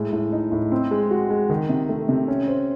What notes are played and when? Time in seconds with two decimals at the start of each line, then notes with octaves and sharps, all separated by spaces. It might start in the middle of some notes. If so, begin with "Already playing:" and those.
Already playing: A2 G#3
0.13 A2
0.32 D#4
0.52 A2
0.72 C4
0.91 G#3
1.11 F#4
1.30 G#3
1.49 D#3
1.69 C3
1.89 A3
2.09 C3
2.28 C#4
2.48 C5